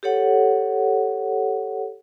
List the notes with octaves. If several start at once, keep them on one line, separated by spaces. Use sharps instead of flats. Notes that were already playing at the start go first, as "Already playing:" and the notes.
G4 A4 C#5 F#5